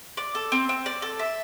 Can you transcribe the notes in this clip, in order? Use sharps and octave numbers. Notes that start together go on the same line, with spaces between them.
D5
A4
C4
C4
D5
A4
E5